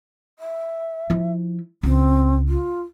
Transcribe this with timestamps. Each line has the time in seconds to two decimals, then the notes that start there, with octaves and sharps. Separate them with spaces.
0.39 E5
1.10 F3 E4
1.83 C#2 C4
2.49 F4